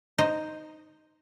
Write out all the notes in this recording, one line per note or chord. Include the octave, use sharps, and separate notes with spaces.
D#4 C5 D#5